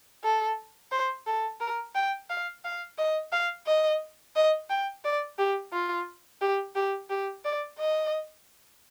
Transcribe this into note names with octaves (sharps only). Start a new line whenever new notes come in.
A4
C5
A4
A#4
G5
F5
F5
D#5
F5
D#5
D#5
G5
D5
G4
F4
G4
G4
G4
D5
D#5